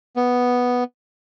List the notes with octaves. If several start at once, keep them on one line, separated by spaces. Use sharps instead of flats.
B3